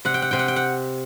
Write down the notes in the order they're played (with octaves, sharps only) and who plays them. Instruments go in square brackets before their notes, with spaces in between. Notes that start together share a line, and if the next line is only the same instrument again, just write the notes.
[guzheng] C3 F#5
G5
F#5
C3 G5
F#5
G5
F#5